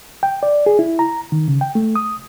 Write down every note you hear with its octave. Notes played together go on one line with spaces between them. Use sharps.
G5
D5
G#4
E4
A#5
D#3
C#3
G5
A3
D#6